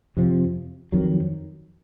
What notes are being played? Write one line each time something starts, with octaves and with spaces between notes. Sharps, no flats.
F2 C3 F3
F2 D#3 F#3